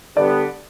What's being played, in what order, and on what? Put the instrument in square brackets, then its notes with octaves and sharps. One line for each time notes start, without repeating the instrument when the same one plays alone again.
[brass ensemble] D3 G3 B3 D4 [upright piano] D5